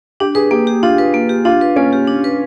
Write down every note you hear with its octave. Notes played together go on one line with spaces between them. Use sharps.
D4 G4
G#4 B4
A#3 G4
G4
D4 F4
B4
A#3
G4
D4 F4
B4
A#3 C#4
G4
D4
B4